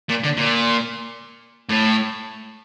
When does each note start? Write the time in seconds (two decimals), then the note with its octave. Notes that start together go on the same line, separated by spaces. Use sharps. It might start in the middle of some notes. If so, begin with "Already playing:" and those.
0.09 A#2
0.24 D3
0.37 A#2
1.69 A2